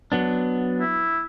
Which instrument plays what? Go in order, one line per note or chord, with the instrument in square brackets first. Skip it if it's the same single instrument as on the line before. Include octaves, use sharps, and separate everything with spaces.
[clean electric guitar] F#3 B3 D4
[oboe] E4